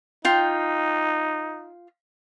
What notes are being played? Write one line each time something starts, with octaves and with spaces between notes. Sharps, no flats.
D#4 F4 G5